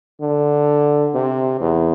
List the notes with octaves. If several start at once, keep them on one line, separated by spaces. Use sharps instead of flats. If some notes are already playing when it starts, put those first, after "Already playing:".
D3
C3
E2